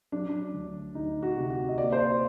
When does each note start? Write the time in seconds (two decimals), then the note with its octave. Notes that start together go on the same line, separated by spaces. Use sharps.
0.12 F#3 D4
0.29 D4
0.54 D2
0.95 D2 D#4
1.23 F#4
1.36 C3
1.50 F#4
1.69 D#5
1.78 A#3 D5
1.92 C5
1.98 D5